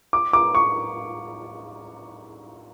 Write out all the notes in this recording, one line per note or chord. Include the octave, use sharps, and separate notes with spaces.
D6
D6
C#6